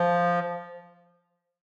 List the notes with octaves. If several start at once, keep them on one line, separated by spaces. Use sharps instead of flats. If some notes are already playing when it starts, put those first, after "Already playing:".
Already playing: F3